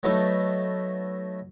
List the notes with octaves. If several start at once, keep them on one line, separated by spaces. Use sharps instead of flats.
F#3 A3 B3 D#4 A4